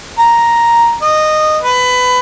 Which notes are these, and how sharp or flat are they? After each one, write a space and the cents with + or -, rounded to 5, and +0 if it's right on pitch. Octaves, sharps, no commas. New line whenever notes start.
A#5 +5
D#5 -15
B4 +20